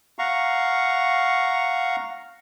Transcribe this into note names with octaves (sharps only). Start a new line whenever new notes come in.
F5 F#5 A#5 C#6